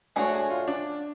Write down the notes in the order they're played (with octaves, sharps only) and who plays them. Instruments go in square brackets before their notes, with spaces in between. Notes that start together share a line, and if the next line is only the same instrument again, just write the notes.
[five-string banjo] A3 D4 F#4 C#5 [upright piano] G#4
[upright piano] G#4
F4
D4